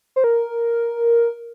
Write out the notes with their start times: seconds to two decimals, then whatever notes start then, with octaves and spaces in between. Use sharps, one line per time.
0.16 C5
0.24 A#4